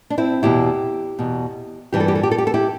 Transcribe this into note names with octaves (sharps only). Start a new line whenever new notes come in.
D4
C4 E4
E2 B2 E4 G4
E2 B2
G2 E3 G4
A4
G4
A4
G4
A4
G4
A4
E4 G4